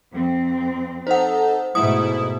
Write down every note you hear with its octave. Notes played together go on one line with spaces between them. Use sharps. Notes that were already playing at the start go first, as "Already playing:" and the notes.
F2 C4
D#4 A4 C5 F#5
G#2 B2 A3 E4 D#6